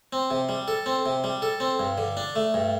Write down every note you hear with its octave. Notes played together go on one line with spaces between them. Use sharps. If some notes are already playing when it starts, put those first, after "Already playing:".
C4
C3
G3
A4
C4
C3
G3
A4
C4
G2
D3
D4
A3
G2